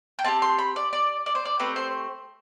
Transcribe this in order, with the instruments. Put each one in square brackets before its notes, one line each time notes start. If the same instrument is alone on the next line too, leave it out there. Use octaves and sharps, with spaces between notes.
[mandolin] G5
C4 E4 G4 A5
C6
B5
D5
D5
D5
C5
D5
A3 C4 G4 B4
C5